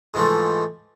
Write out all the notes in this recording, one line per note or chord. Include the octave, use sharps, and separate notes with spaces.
G#2 E3 F3 A3